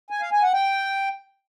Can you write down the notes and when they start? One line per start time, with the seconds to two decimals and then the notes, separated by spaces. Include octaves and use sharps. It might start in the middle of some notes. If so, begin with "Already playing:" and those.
0.10 G#5
0.21 F5
0.32 G#5
0.43 F#5
0.54 G5